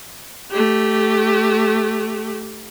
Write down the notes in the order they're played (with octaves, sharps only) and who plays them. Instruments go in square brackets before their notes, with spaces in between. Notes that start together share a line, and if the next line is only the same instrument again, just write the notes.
[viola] A3 G4